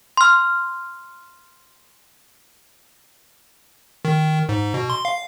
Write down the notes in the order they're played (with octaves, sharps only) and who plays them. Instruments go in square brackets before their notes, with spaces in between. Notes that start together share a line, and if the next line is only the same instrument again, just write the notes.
[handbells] C6 F6
[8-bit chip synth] D#3
G#2
B2
C6
F5